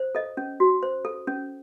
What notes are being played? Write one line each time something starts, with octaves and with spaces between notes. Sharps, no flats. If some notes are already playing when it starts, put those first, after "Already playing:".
Already playing: C5
A4 D#5
C#4
F#4
C5
A4
C#4